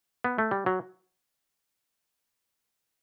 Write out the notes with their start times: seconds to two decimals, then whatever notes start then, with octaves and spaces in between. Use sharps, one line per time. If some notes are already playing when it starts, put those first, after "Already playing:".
0.24 B3
0.38 A3
0.51 G3
0.66 F#3